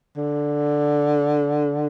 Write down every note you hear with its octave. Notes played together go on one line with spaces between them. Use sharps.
D3